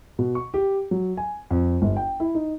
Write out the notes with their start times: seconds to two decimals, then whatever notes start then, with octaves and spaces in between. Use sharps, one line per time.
0.19 B2
0.35 C#6
0.54 G4
0.91 F#3
1.17 G#5
1.51 F2
1.82 G1
1.96 G5
2.20 E4
2.35 D#4